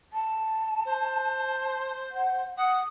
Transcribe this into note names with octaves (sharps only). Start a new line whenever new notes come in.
A5
C5
F#5
F#5 D#6